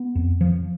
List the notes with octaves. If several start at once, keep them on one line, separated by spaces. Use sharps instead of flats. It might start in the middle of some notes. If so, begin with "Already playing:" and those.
Already playing: B3
F2
F3